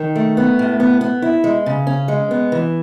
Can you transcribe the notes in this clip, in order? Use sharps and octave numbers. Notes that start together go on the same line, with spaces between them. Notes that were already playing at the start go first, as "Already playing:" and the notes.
Already playing: D#3
A3
B3
A2
B3
B3
E4
G#3
C#3
C#4
G#3
B3
E3